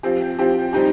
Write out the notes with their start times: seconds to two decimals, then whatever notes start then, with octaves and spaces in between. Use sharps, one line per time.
0.03 F3 C4 G4
0.39 F3 C4 G4
0.73 G3 C4 D#4 G4